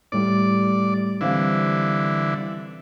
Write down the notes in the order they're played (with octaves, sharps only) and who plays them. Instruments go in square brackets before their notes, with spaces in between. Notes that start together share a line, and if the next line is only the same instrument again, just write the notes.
[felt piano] A2 G3 [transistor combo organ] D5
[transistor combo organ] D3 E3 [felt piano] G3 C4 F5